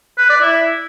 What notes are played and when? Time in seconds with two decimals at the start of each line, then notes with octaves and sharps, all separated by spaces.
0.18 B4
0.29 D5
0.41 E4